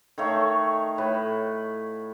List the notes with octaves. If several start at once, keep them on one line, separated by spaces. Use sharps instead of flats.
D#3 A3 C#5 F5
A2 B4